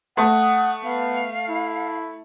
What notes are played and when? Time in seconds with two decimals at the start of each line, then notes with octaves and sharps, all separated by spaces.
0.17 A3 F#5 D#6
0.83 B3 F5
1.49 E4